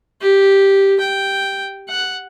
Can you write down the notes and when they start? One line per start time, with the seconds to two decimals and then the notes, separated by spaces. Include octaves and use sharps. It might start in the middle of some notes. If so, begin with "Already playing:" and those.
0.21 G4
1.00 G5
1.89 F#5